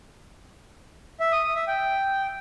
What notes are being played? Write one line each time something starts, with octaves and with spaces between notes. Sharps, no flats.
E5
D#6
D#6
E5
G5